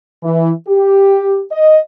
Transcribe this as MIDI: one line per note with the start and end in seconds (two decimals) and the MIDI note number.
0.23 0.51 52
0.68 1.41 67
1.51 1.80 75